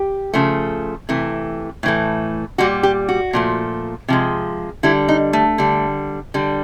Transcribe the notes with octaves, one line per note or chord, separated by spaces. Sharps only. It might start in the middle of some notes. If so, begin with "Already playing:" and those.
Already playing: G4
C#3 F3 A3
C3 E3 A3
A2 E3 A3
A#2 G3 F#4
G4
F#4
A#2 F3 A3
C3 F3 G#3
D3 G3 E4
D#4
A3
D3 G3
D3 G3